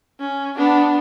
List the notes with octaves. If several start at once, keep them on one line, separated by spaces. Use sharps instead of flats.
C#4
B3 D4